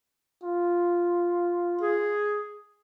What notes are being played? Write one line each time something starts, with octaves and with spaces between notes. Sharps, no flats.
F4
G#4